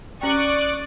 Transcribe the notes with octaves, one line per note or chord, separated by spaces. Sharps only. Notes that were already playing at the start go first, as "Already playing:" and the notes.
C#4 D5 G5 C#6 D#6 F#6